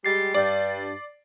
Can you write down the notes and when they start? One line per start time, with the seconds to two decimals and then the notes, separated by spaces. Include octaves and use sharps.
0.05 G3 G#3 G4 A6 C7
0.34 G2 D5